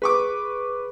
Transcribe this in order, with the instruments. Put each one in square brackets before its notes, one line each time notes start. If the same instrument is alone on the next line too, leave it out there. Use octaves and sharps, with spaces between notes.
[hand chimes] G#4 [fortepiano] B4 C#6 D6